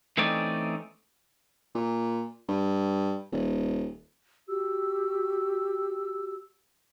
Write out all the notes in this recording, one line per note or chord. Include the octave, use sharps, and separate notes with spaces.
E3 A3 C4 C#4 D#4 D5
A#2
G2
D#1
F#4 G4 E6